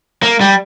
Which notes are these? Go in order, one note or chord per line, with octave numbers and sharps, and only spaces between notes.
A#3
G3